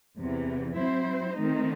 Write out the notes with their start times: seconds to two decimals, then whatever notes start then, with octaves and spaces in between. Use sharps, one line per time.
0.19 E2 C3 E3
0.77 F#3 C4 E4 C5
1.36 D#3 A3 C4 D#4